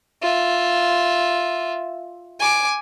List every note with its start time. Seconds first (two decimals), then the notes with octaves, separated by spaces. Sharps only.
0.22 F4 E5
2.40 G#5 D6